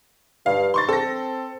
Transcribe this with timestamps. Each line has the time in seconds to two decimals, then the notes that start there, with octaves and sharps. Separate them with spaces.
0.46 G2 F5
0.74 C6 C#6 A6
0.89 C4 A4 A#6